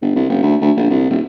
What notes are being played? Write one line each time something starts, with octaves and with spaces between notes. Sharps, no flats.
G1
C2
F#1
D2
D2
A#1
C2
D#1